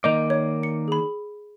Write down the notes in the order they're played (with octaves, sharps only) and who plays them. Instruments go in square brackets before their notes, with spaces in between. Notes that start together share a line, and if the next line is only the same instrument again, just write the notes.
[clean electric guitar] D#3 A#3 D5 [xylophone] D#5 G6 F7
[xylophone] C#5
C#7
G#4 B5